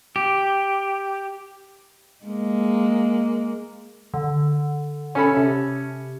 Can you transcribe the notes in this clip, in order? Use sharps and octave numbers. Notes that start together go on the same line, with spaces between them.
G4
G#3 A#3
D3
C#4 A4 B5
C3